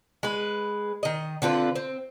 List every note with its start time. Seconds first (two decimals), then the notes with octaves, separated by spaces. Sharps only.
0.23 G#3 B4
1.03 D#3 D#5
1.42 D3 C4 F4 B4
1.75 C4